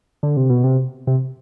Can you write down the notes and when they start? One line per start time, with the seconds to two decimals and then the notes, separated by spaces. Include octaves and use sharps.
0.23 D3
0.37 C3
0.50 B2
0.64 C3
1.07 C3